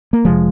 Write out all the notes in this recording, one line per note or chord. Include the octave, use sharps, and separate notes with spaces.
A#3
F1 C3 F3 G#3